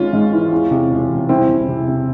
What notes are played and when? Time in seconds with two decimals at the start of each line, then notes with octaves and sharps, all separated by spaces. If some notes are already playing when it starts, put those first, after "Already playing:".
Already playing: G#1 G#2 C#4 F4
0.13 G#2
0.33 E3
0.52 E2
0.71 C3
0.91 E1
1.09 E1
1.29 C2 C4 E4
1.48 C3
1.68 C3
1.87 C3